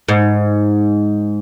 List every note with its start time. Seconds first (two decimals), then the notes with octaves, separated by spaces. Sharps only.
0.08 G#2